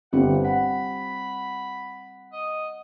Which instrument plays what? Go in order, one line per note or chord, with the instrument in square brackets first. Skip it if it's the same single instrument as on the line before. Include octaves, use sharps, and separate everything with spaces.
[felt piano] G1 G4 [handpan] G3 C4 F4 [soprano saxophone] F#5
[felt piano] F#5 [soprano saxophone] B5
[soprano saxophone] D#5